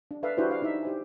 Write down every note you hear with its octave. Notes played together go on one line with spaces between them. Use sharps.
D4
A4 B4 D5 E5 F5
D4 E4 F#4 G4 B4 C5
B4 F5
D#4 E4 D5 E5
G4 C5 G#5